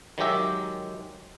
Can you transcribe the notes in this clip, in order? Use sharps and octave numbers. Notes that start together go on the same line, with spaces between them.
D#3 F#3 G#3 G4 E5